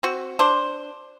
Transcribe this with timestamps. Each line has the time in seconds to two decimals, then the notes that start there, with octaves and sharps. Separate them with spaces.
0.03 C4 F#4
0.39 D4 C5